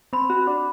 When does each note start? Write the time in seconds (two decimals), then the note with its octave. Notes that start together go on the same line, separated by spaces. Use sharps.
0.13 C4 B5
0.30 F#4
0.47 D4